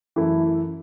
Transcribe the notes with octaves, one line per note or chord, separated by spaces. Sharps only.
F#2 E3 A3 E4